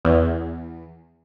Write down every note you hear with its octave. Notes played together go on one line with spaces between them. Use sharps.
E2